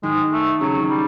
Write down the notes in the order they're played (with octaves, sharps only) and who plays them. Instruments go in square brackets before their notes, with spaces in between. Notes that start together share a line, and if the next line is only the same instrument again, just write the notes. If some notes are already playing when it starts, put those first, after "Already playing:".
[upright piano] D#3 [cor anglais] G#3
[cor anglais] A3
[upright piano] C#3 [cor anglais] F#3
[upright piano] D#3
[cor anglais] G3